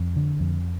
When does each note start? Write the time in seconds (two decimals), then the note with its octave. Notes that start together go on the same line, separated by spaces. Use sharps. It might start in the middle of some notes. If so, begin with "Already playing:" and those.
Already playing: F2
0.16 D3
0.40 F2